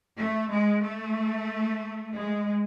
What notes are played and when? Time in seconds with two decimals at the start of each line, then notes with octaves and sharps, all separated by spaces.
0.17 A3
0.51 G#3
0.83 A3
2.15 G#3